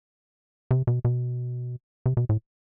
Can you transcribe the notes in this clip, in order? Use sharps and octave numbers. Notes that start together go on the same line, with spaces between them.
C3
B2
B2
C3
B2
A2